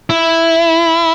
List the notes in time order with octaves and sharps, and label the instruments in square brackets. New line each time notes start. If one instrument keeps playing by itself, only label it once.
[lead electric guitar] E4